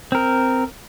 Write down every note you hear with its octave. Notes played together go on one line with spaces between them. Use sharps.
C4 A#4